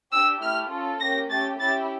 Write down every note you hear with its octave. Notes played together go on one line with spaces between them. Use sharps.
D4 G4 E6
A3 E4 G4 F6
C#4 F4 A4
A#3 C#4 G4 A#6
A3 C#4 G4 A6
C#4 E4 G4 A6